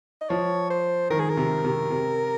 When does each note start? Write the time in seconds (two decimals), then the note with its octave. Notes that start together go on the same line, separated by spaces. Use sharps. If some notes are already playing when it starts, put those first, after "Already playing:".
0.22 D#5
0.30 F3 C#5
0.70 C5
1.10 D#3 A#4
1.20 G#4
1.30 A#4
1.37 C3
1.65 C3
1.90 C3